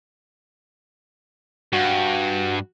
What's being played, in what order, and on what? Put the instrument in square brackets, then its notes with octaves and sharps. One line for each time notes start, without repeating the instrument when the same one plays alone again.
[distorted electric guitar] G2 [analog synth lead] F#4